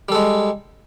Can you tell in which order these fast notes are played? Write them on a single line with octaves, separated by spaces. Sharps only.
G3 A4 G#3